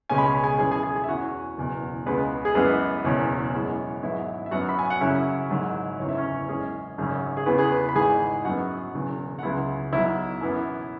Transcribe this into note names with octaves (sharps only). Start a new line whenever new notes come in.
C#2 B2 G#3 C#4 G#5
B5
G#5
B5
G#4 G#5
F#2 E3 C#4 G#4 G#5
G#4 G#5
G#4 G#5
G#4 G#5
E5
E2 E3 C#4 F#4 F#5
F#1 E2 B2
C#2 C#3 G#3 B3 B4
G#4
F#2 E3 G#3 B3 B4
F#1 E2 B2 F#3 C#4 C#5
F#2 E3 G#3 B3
G#1 G#2 F#3 B3 E4 E5
E5
F#2 F#3 B3 F#4 F#5
B5
G#5
F#5
F#2 C#3 F#3 C#4 E4 E5
G#1 G#2 F#3
F#1 E2 E3 C#4 C#5
E5
C#4 C#5
F#2 E3 G#3 C#4 G#4
G#1 F#2 C#3 F#3 C#4
G#4
E2 C#3 E3 B3 B4
G#4
B4
B5
G#1 G#2 E3 G#4 G#5
F#2 F#3 B3 F#4 F#5
E1 E2 C#3 F#3
F#5
C#2 C#3 F#3 B3 E4 E5
B1 B2 F#3 E4 E5
F#2 E3 B3